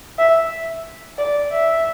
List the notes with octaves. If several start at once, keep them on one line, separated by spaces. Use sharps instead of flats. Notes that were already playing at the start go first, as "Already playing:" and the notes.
E5
D5
E5